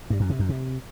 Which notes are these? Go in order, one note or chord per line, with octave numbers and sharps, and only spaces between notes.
G2
F#2
C3
F#2
C3